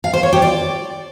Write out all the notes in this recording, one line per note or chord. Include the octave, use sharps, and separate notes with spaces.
F5
C5
C#5
G4
D5